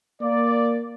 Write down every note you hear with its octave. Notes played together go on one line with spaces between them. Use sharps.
A#3 D5